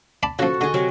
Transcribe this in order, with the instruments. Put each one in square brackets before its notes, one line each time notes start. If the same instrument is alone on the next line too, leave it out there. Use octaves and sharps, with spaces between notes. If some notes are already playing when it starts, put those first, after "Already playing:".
[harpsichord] D5 A5 B5
[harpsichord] C#3 F3 [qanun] F#4 A4
[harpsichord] D3 [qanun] G#4 D#5
[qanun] C3 F#3 C4